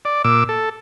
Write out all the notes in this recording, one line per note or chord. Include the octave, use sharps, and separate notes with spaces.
D5
A#2 D6 E6
A4